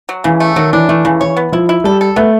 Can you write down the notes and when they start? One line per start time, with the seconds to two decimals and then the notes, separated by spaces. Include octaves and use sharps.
0.09 F#3
0.24 C#3 E3
0.40 A3
0.56 D#3 F#3
0.73 E3 D4
0.89 E3 A3
1.05 C#3 E3
1.21 E3 C#5
1.37 B3
1.52 F3 E4
1.69 E4
1.84 G3 A4
2.01 A4
2.16 A3 B3